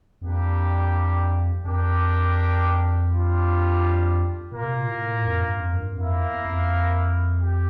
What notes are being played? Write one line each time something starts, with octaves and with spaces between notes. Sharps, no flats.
F2 G3 A#3 D4 G4
F2 D4 G4 A#4 D5 G5
G3 D4 F4
A#2 A#3 F4 A#4
C3
A#2
A2
F2
G2
F2
G2
F2 A#3 E4 A#4 F5
E2
F2
G4